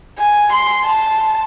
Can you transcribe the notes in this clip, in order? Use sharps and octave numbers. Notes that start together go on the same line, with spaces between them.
G#5
C6
A5